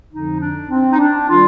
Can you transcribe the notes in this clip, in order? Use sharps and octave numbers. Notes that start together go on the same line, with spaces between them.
F2 D3 F3 D#4
D4
C4
D#4
D4
D#3 G3 F4